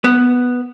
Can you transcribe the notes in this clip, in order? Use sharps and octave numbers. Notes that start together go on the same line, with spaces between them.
B3